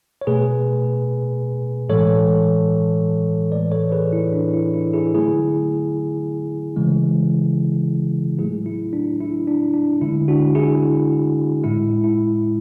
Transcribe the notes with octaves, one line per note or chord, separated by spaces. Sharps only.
C#5
B2 A3 G#4 B4
A2 E3 G#3 A4 C#5
A2 E3 A3 B4 D5
A4 C#5
G#4 B4
E4
D4
E4
E4
E4 G#4
D3 F#3 A3 E4 G#4
C#3 E3 G#3
A2 F#3 A3 E4 G#4
E4
D4
E4
D4
D4
D3 G#3 E4
D4 F#4
E4 G#4
A2 G#3 E4
E4